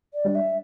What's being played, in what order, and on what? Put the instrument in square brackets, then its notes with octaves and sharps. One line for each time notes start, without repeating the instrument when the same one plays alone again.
[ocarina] D5
[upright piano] G3 D4
[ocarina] E5